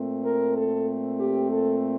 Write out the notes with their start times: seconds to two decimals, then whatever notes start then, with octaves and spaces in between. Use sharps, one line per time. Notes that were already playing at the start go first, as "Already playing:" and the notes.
Already playing: A#2 A3 C4
0.24 A#4
0.56 A4
1.18 G4
1.50 A4